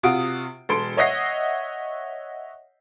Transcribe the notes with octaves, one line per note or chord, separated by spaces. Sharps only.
C3 F4 F#4 D#6 D7
E1 A4 C6 D7
C#5 D#5 E5 F#5 A#6 C7